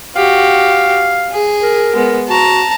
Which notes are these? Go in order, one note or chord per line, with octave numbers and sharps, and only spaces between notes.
F#4 G4 F5
G#4
A#4
G#3 B3
F#4 A5 A#5